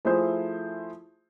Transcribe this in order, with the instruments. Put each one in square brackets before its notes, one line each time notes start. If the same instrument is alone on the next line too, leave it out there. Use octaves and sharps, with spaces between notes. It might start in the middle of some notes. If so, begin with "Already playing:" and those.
[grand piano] F3 A3 E4 F4 G#4 C5